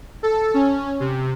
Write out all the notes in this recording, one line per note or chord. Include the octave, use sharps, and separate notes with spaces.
A4
C#4
C3